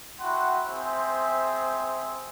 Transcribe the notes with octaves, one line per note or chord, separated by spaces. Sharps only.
E4 F#4 F#5 G5 C6
C4 G#4 C5 E5